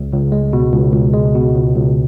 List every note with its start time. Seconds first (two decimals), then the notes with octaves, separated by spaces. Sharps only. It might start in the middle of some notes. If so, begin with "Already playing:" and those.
Already playing: C#2
0.12 C#2
0.32 G#3
0.53 B2
0.74 C#2
0.93 C#2
1.14 G#3
1.34 B2
1.56 C#2
1.75 C#2